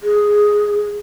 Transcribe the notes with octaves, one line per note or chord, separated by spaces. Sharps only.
G#4